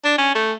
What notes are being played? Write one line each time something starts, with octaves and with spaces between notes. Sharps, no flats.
D4
C#4
A3